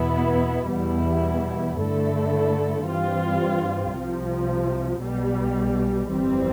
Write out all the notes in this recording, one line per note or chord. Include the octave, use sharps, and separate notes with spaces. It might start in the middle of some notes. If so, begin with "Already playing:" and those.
Already playing: E2 B2 B3 E4
E2 B2 G3 B3 E4
G2 D3 A3 E4 A4
G2 E3 G3 C4 F4
C2 C3 F3
B1 B2 G3
G1 F2 E3 G3 C4